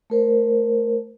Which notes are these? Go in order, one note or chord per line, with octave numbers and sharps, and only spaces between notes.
A3 A#4 C5